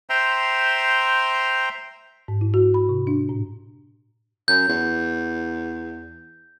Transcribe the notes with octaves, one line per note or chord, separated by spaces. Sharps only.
C5 E5 G5 A#5 C6
G#2
E4
F#4
B5
C3
D4
A2
F#2 G6
E2